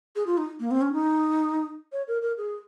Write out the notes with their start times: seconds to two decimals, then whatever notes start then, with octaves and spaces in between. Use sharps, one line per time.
0.16 G#4
0.27 F4
0.38 D#4
0.60 A#3
0.71 C4
0.81 C#4
0.93 D#4
1.92 C#5
2.08 A#4
2.22 A#4
2.38 G#4